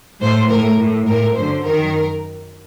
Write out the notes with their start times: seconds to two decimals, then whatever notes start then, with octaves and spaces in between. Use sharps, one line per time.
0.21 A2 C5
0.50 A2 A#4
0.78 A2
1.06 A2 A#4
1.35 F#2 D3 C5
1.63 F#2 D#3 A#4